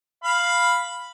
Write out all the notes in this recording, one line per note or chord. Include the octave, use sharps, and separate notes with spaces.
F5 B5